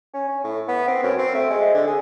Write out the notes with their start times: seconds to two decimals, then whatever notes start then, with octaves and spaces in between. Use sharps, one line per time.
0.13 C#4
0.28 C#4
0.44 A2
0.68 B3
0.87 C4
1.03 F#2
1.18 C4
1.34 A3
1.50 G#3
1.74 D3
1.87 G#4